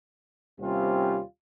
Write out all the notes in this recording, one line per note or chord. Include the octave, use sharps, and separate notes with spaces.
D#2 C3 G3 C4 C#4 F4